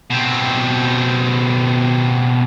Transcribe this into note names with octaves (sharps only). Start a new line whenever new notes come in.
B2 C4